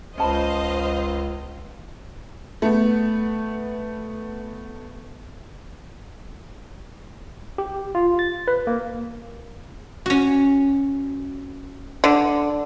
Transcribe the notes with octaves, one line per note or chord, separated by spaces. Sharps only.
C#2 C#4 C5 D#5 F5 A5 B5
A3 B3
G4
F4
A6
B4
A#3
C#4 F#4
D3